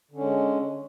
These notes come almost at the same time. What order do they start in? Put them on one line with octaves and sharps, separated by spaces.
D3 C#4 G#3